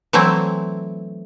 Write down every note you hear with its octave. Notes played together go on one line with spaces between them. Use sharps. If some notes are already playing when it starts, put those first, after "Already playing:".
E3 F#3 A3 C4 E4